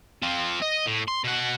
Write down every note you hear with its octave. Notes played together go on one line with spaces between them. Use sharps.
C4 F4
D#5
A2
C6
B2 F#5